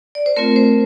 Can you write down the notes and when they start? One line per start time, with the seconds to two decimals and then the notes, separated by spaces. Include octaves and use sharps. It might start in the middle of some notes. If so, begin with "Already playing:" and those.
0.15 D5
0.26 C5
0.36 A3 C4 F4 A#4
0.56 C5